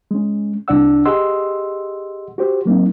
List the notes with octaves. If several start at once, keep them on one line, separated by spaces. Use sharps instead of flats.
G#3 C#4
C2 D4 D5 F#5 E6
G4 G#4 D#5 F#5 C6 E6
F#4 G4 C5
F#3 A#3 C4 D#4